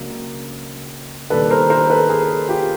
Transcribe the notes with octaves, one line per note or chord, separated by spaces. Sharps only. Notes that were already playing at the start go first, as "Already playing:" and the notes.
Already playing: C#2 C#3 F#3 A#3 D4
D#2 D#3 G3 A#3 D4 A4 B4
A#4 C5
A#4 C5
A4 B4
G#4 A#4
F4 G4